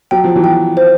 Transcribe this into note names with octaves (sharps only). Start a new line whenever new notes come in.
F#3 G5
F3
E3 F#3
G5
C5